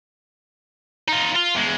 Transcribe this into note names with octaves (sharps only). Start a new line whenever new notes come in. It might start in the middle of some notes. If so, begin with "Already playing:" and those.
D#4 F4
F4
E2 G#3